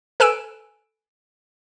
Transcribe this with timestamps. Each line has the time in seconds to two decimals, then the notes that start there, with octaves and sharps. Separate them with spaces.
0.20 A4 B4 G#5 E6 D7 E7